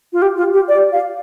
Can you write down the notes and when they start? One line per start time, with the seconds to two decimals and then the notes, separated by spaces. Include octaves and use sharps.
0.13 F4
0.22 G4
0.37 F4
0.53 G4
0.68 D5
0.93 F5